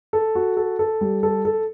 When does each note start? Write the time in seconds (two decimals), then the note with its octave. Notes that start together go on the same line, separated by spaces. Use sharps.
0.13 A4
0.35 F#4
0.57 A4
0.79 A4
1.01 G3
1.23 A4
1.45 A4